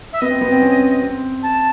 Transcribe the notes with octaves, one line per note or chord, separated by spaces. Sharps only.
E5
B3 D#5
C4
B3
C4
C#4
C4
A5